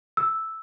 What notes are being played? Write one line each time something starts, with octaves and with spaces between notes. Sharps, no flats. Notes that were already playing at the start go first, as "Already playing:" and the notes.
E6